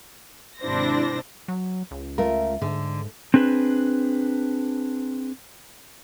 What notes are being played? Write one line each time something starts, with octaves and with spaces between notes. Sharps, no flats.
G#1 C3 D4 E4 C5 A#6
F#3
C#2
A3 F4 A#4
G#2 D3
C4 D4 G#4 B4